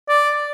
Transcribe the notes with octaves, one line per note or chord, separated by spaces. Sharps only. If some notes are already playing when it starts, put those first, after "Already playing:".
D5